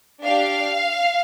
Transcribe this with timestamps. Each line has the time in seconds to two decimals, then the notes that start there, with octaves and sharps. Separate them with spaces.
0.22 D4 G4 F5